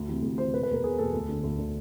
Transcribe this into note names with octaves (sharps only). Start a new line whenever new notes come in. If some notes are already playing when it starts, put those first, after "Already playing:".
Already playing: D2
C3 E3
D2
C3 E3 C5
E1 B4
B4
E2 B2 A#4
E1 G#4
E2 B2 A4
D2
D3
D2
D3